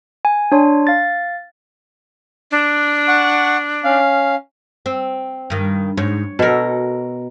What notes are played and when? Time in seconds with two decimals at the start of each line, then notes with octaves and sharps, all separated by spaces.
0.25 G#5
0.52 D4 C#5 C6
0.87 F5 A6
2.51 D4
3.08 F#5 C#6
3.84 C#4 F5
4.86 C4
5.50 G2 D#3
5.97 G#2 C#5
6.39 B2 F#4 A4 A#4